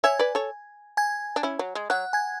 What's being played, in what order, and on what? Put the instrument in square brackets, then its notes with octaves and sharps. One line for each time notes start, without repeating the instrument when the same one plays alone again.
[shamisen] C#5 E5 [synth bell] G#5 G#6
[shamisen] B4 D5
A4 C#5
[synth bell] G#5 G#6
[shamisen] D4
C#4 E4
F#3
G#3
[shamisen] F#3 [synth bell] F#5 F#6
[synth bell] G#5 G#6